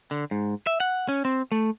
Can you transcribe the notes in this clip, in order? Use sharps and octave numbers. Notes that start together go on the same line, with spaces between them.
D3
G#2
E5
F#5
C#4
C4
A3